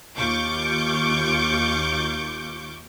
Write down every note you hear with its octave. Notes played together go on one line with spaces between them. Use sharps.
D#2 F4 C#6 D6 G6